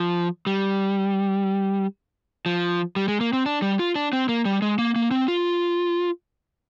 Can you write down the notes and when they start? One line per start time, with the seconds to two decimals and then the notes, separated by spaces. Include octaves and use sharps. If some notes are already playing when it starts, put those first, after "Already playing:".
Already playing: F3
0.46 G3
2.46 F3
2.96 G3
3.08 G#3
3.20 A#3
3.33 C4
3.46 D4
3.62 G3
3.79 F4
3.95 D4
4.13 C4
4.29 A#3
4.45 G3
4.62 G#3
4.78 A#3
4.96 A#3
5.11 C4
5.28 F4